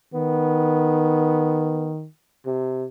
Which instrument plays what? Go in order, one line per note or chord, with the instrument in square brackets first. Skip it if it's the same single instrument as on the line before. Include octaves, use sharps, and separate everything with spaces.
[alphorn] D#3 [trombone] B3
[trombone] C3